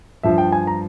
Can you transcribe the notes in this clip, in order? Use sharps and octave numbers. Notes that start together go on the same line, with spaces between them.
G2 F3 E5
G5
G#5
A#5